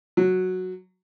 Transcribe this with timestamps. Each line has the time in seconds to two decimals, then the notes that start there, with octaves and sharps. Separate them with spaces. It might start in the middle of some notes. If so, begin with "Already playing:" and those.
0.17 F#3